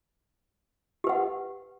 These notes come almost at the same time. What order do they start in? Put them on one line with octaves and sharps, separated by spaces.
G4 B4 F#5